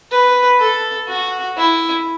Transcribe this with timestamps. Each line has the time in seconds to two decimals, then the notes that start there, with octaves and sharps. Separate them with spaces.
0.11 B4
0.59 A4
1.08 F#4
1.57 E4